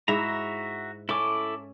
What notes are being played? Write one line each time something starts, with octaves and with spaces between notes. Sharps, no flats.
G#2 E4 F#4 E5 A#5
C#4 E4 A4 D6